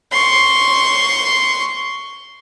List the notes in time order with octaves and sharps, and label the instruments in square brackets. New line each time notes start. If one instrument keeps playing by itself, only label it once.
[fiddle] C6 C#6